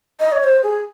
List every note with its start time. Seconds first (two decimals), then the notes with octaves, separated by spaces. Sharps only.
0.20 D#5
0.32 C#5
0.44 C5
0.63 G#4